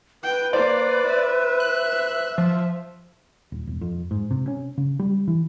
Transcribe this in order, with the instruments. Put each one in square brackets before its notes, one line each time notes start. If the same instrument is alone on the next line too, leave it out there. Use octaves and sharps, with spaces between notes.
[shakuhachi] B4 [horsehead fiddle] G5
[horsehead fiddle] A#3 [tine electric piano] C5 [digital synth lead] D5
[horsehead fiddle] E5
[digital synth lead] F#6
F3
[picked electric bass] D#1
E1
F2
G#2
C3
C#4
C#3
G3
E3